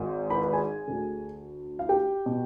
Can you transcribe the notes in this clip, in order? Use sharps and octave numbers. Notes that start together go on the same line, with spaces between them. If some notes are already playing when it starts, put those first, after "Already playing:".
Already playing: G#1 G#2 D#3
B4 B5
B4 B5
G#4 G#5
D2 D3
F5
G4 G5
B2